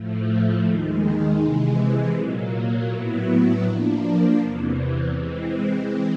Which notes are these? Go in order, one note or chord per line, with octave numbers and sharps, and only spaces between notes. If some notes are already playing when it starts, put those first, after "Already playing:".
Already playing: A2 F3 A3
D#2 D#3 G#3
C3 E3 G#3
A#2 F#3 A#3
A2 F#3 B3 E4
F3 A#3 D4
E2 C3 E3
E3 G#3 C4